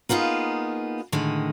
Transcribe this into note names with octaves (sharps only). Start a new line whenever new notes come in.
A#3 B3 D#4 F4 G#4
A2 D3 D#3 G#3